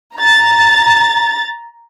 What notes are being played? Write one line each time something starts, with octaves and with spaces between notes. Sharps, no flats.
A#5 A6